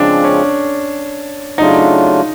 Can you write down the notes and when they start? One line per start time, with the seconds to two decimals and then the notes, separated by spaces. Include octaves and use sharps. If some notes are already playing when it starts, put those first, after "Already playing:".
Already playing: C#3 F3 G#3 C4 D4
0.24 C#4
1.58 C#3 F#3 A3 D4 D#4 F4